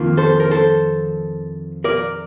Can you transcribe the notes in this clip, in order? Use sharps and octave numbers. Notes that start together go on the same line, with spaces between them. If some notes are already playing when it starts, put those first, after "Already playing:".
Already playing: F2 D#3 A#3 F4
A4 C5
A#4
A4 C5
A#4 D5